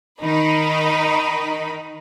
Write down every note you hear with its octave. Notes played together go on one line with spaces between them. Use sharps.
D#3 D#4 B5